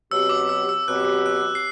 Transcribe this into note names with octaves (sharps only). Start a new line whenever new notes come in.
B2 F#3 C4 G4 E6
D6
E6
E6
B2 F#3 C4 G4 F#6
F#6
C7